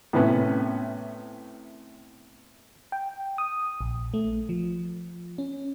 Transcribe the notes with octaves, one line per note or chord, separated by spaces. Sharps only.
A2 C3 B3 C#4
G5
D#6
A#1
A3
F3
C#4